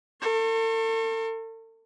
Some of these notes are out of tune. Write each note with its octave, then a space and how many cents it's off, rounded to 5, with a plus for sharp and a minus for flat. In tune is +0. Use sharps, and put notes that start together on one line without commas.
A4 +40 C#6 -35